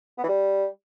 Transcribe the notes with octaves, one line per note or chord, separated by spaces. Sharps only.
B3
E3
G3